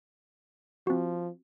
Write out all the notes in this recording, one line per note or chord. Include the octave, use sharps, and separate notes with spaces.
F3 C4 F#4